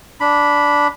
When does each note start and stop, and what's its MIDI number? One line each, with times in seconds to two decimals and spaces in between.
0.21 0.88 62
0.21 0.88 83